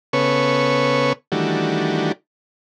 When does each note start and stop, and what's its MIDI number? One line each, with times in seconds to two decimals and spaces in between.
0.13 1.13 49
0.13 1.13 59
0.13 1.13 69
0.13 1.13 71
0.13 1.13 73
0.13 1.13 85
1.32 2.12 51
1.32 2.12 52
1.32 2.12 55
1.32 2.12 57
1.32 2.12 62
1.32 2.12 66